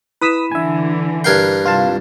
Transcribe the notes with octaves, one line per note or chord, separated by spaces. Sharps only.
E4 B4 B5 D#6 B6 E7
D3 E3 E5 G#5
G2 A#4 G5 F#6 G#6 C7
C2 F4 F5 A5